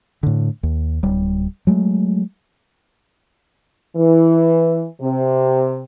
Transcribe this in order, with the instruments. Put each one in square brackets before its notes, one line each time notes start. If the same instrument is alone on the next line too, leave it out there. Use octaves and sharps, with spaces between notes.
[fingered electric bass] A2 D3
D#2
D1 G3
F#3 G#3 A3
[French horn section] E3
C3